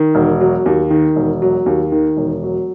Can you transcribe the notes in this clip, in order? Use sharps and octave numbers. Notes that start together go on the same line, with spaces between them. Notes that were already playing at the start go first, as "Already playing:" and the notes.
Already playing: D#3
E1
F#3
D#2
D#3
E1
F#3
D#2
D#3
E1
F#3